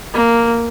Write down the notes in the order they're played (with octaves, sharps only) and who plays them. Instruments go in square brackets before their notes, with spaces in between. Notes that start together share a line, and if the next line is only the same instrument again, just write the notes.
[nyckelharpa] A#3